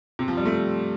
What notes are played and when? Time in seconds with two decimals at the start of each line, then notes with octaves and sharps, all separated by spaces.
0.19 C3
0.28 F3
0.37 G3
0.45 A3